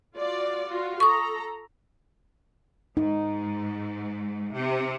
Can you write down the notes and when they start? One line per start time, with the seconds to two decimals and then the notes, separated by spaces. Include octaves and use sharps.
0.16 F4 F#4 D5
0.66 F4 F#4
1.00 A4 A#5 C#6 D#6
2.97 G#2 D#4
4.53 C3